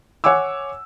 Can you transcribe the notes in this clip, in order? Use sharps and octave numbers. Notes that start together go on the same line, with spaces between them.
C#5 F#5 G#5 D6 E6